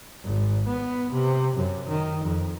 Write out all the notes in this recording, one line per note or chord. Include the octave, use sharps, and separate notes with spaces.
G#1
B3
C3
F#2
D#3
F2